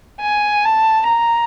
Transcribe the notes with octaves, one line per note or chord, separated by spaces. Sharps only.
G#5
A5
A#5